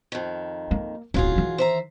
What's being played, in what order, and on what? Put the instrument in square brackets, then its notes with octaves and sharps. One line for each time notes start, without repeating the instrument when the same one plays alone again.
[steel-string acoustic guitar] F2 D#3
[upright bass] A#3
[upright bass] D1 A1 [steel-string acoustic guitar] F#3 F4 G#4
[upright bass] D#3 E3
[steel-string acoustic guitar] C5 E5 A#5